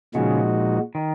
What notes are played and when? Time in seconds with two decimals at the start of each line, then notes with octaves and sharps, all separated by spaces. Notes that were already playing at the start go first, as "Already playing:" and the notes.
0.15 A#2 C#3 F3 G#3 D#4 F#4
0.95 D#3